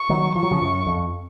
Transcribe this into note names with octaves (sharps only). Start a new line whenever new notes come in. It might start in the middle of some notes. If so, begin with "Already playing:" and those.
Already playing: C#6
D#3 F#3
F3 C#6
F#3
C#3 F3
F#2
F2